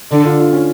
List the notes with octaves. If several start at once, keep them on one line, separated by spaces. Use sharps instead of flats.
D3 D4
F4
F4
C#4